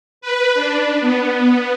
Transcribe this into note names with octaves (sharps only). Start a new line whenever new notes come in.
B4
D4
B3